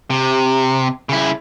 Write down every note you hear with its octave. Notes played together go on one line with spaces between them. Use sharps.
C3
C#3 E4